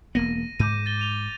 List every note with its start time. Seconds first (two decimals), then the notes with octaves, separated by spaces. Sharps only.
0.15 E1 A#3 B3 A#6 D#7
0.59 G#2 D6 G6 D#7
0.86 A6 G7
0.99 D#7 F7 G7